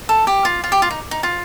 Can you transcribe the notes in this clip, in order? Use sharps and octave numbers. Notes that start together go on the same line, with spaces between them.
A4
G4
F4
F4
G4
F4
D#4
D#4
F4